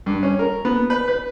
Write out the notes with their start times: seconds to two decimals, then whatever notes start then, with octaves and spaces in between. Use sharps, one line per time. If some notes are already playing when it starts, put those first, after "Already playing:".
0.06 G2
0.23 C#4
0.39 A#4
0.65 B3
0.90 B4
1.08 B4